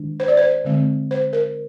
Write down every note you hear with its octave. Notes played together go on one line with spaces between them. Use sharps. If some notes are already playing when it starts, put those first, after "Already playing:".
Already playing: D#3 G#3 D4
C5
D5
C5
D3 G#3 C4
C5
A#4